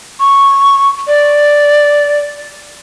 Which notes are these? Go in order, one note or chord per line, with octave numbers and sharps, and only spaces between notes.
C#6
D5